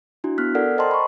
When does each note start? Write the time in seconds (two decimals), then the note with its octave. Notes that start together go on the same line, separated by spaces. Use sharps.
0.24 D4 E4 F#4
0.38 B3 F6 F#6 B6
0.55 A4 A#4 D5 F#5 F6
0.78 C5 D#5 G5 A5 A#5 C6
0.91 B5 C#6